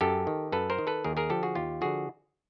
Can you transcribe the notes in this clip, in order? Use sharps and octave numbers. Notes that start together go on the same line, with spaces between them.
F#2 G4 A4
D#3
F#2 A4 B4
A#4 C5
D#3
A4 B4
D#2 G#4 A#4
G#4 A#4
D3 F3 G4 A4
F#4 G#4
D#2 F4 G4
D3 F3 F#4 G#4